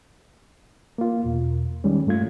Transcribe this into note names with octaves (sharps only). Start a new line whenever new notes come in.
A#3 F4
E2 B2
D#3 G3 G#3 C#4
G2 G#3 A3 F4 G#6